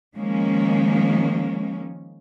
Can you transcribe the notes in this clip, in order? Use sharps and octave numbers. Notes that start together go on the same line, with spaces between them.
D#3 F3 G#3 A#3 C#4